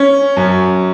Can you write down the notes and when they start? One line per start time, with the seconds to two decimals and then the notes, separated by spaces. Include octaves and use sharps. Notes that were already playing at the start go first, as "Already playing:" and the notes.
Already playing: C#4
0.37 F#2